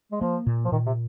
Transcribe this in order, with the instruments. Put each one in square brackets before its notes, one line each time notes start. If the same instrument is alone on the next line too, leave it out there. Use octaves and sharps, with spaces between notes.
[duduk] G#3
[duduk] F3 [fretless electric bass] A#3
[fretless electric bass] A#2
[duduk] F3
[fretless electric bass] A#2 [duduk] D#3
[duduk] C3